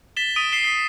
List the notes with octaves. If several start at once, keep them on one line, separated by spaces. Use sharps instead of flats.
A6 B6 E7 G7
D#6 B6 D7 D#7 G7
B6 C7 E7 G7
B6